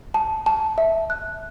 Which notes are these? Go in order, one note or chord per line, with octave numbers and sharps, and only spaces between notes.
A5
A5
E5
F#6